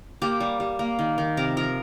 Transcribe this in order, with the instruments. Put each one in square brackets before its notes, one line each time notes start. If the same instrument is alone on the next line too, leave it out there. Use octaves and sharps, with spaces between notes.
[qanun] A#3 G4
G3
G3
A#3
D#3
D#3
C3 A#4
F3 A#4